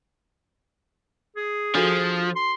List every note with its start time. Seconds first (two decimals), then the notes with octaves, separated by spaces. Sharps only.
1.36 G#4
1.75 F3 D4 F#4 A4
2.36 C6